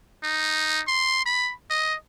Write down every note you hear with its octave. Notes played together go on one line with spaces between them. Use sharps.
D#4
C6
B5
D#5